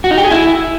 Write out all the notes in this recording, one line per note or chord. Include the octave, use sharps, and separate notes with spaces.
F#4
D#4
G4
G#4
E4